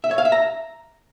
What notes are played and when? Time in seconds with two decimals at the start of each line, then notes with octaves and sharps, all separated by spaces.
0.04 E5
0.11 C#5
0.18 F5
0.25 E5
0.32 A#5